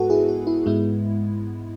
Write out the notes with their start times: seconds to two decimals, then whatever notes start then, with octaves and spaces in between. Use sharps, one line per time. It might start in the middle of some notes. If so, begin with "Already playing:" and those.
Already playing: G#2 G#3 B3 F#4 A4 B4
0.10 E4 G#4
0.28 F#4
0.47 E4
0.66 G#2 G#3 B3 E4